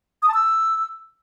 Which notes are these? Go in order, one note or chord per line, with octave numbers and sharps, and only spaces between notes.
D#6
A5
E6